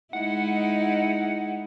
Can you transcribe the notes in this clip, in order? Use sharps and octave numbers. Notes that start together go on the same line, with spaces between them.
G#3 D#4 E4 F#5